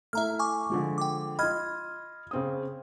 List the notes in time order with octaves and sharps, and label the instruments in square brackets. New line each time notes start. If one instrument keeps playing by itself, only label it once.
[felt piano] A3 E4 [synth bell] E5 A#5 F6
[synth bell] G#5 C#6 D6
[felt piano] D3 F3 G#3
[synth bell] G5 D6
[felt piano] F4 D#5 [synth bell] B5 F6 G#6
[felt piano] C#3 C4 D#6